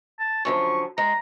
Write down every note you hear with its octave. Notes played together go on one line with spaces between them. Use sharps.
A5
F#2 D3 F3 C#6
G#3 A#5